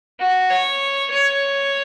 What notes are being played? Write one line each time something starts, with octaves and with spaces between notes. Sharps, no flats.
F#4
C#5
C#5